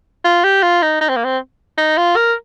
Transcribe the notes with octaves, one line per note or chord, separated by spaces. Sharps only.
F4
G4
F4
D#4
D#4
C4
A#3
C4
D#4
F4
A#4